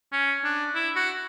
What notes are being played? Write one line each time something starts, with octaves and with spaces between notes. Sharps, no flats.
C#4
D4
E4
F#4